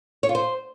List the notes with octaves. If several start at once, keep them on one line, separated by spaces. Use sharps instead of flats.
C#5
F4
C5